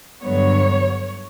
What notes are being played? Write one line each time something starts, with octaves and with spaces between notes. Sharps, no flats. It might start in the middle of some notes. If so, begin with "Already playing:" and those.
G2 D3 F#3 B3 C#5